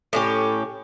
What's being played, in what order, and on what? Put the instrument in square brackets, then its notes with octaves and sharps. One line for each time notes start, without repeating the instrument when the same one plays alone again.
[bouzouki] A2 C#4 G4